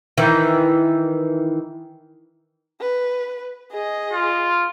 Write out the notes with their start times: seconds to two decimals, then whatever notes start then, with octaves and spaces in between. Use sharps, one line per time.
0.18 D#3 E3
2.81 B4
3.72 G#4 D#5
4.13 F4